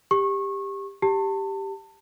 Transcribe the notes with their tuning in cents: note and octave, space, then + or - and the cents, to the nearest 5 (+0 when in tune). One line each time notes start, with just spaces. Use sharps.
G4 +15 C#6 -25
G4 +0 A5 +30